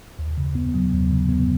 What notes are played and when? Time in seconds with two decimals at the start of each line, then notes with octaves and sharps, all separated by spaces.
0.19 D#2
0.38 C#3
0.55 B3
0.74 F#3
0.93 D#2
1.11 C#3
1.29 B3